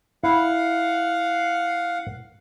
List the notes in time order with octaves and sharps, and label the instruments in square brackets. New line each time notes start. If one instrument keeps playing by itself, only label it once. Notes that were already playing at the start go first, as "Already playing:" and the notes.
[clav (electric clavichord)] E4 [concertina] F5 F#5